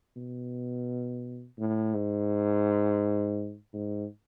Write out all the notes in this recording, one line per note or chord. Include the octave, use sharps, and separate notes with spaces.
B2
A2
G#2
G#2